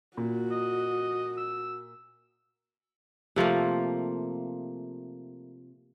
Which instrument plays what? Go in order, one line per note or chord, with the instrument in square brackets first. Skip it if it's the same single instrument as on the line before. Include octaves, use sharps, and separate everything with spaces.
[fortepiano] A#2 [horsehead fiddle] F#4
[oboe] D#5
E6
[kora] C3 F3 A3 A#3